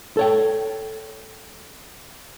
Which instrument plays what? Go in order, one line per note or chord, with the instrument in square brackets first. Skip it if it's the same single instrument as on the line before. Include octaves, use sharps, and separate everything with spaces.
[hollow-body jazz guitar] A4 C#5 G5